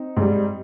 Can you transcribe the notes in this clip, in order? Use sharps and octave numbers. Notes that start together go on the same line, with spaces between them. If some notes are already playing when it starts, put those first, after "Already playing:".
Already playing: C4 D#4
G#2 G3